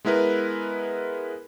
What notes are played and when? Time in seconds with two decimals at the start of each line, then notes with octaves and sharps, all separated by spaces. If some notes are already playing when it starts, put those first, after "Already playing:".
0.05 G#3 B3 E4 A#4 B4